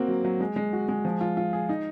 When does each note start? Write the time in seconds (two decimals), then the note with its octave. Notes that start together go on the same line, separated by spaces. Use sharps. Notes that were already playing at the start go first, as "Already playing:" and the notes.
Already playing: A#3 C4 F#4
0.08 F#3
0.25 F#3
0.40 G#3
0.56 G#3
0.73 F#4
0.89 G#3
1.05 F3
1.21 F4
1.37 F4
1.53 G#4
1.69 D#4